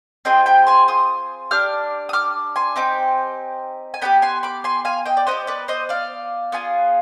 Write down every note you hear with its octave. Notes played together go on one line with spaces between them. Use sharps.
C4 F4 G#4 D#5 G5
G5 B5
G#5 C6
C6 D#6
D4 G4 D6 F6
D#6
D6 F6
G#5 C6
C4 D#4 G4
G#5
B3 D4 G4 G5 B5
G#5 C6
B5 D6
G#5 C6
F5 G#5
D#5 G5
D5
B3 D#4 G4 C5 D#5
B4 D5
C5 D#5
D5 F5
B3 F4 G#4